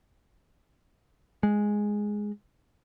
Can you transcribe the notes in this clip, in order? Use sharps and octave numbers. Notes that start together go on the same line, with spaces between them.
G#3